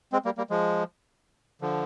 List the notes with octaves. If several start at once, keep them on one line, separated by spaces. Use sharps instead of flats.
G#3 C4
G3 A#3
G3 A#3
F3 G#3
D3 F3